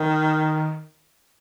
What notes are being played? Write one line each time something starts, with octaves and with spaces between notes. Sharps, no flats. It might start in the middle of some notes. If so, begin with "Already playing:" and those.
Already playing: D#3